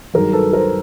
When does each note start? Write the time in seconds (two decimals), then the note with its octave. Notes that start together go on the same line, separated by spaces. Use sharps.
0.14 G2 D#3 F#3 G#4 A#4
0.33 A4 B4
0.53 A#4 C5